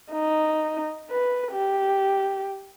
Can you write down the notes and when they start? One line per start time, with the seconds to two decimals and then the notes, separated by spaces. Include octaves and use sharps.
0.11 D#4
1.11 B4
1.53 G4